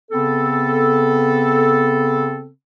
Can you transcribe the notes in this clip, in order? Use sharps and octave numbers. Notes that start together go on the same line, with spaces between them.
C#3 B3 C4 A4